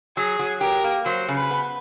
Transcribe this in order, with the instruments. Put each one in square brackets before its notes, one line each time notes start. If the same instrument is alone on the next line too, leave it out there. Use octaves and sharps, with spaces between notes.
[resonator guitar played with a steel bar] F#3 [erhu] G#4
[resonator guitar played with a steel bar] F#3
[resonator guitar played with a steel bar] G4 [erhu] A#4
[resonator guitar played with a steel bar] A#3
[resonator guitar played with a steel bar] F#3 [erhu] C5
[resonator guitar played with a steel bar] C#3
[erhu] B4
[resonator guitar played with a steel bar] B3